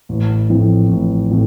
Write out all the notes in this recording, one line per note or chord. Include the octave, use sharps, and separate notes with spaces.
A1
A2 F3 C4
A1
A2 F3 C4